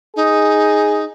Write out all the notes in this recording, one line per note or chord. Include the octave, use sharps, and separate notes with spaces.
D#4 G#4